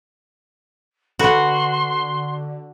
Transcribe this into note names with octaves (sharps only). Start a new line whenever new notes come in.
D3 F#4 A4 B4 B5 C6